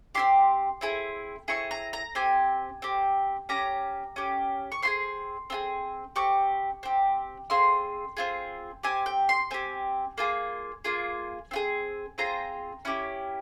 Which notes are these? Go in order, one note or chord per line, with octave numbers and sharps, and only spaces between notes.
C4 E4 G4 C6
C4 E4 G#4
C4 E4 G#4 C#6
A#5
A#5
C4 G4 G#5
C4 G4
C#4 G4 A#5
C#4 G4
C#6
C4 F4 G#4 C6
C4 F4 G#4
C4 G4 C#6
C4 G4
C4 F4 G#4 C6
C4 F4 G#4
C4 G4 G#5
G5
C6
C4 G4 G#5
A#3 F4 G#4
A#3 F4 G#4
C4 F4 G#4
C4 F4 G#4 A#5
C#4 E4 G4